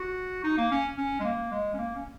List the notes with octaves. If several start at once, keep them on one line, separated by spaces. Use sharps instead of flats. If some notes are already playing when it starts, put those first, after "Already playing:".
Already playing: F#4
D#4
A#3
C#4
C#4
G#3
A#3
G#3
C#4
A#3
C#4